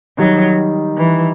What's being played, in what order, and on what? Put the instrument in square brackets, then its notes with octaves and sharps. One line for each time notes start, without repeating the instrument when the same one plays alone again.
[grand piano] D#3 G3 D#4 [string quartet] F#3
[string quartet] E3